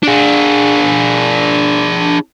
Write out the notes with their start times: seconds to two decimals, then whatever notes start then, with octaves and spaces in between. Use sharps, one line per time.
0.04 D4 G#4